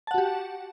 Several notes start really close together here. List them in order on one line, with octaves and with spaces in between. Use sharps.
A5 F#5 F#4 G4